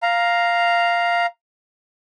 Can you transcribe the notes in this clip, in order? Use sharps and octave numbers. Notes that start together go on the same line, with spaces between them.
F5 A#5